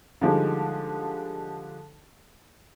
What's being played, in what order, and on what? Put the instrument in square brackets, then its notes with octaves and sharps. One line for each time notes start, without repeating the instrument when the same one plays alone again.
[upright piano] D3 F3 G3 G#3 D#4